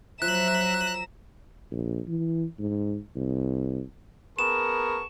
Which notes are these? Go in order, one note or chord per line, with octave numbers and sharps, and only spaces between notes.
F3 F#3 E5 A#5 F#6 E7
A#1
E3
G#2
C2
B3 G#4 A#4 A5 C#6 E7